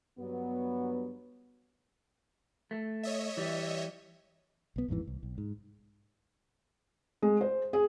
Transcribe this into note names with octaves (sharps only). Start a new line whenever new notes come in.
G2 F#3 B3
A3
C#5 D#5 E5
E3 G3
B1 B3
A1 F2 G#2 E3
C2
B1
G#2
G#3
C5
G#4